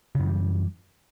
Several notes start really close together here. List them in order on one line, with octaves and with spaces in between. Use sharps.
C#3 F#2 E3 G3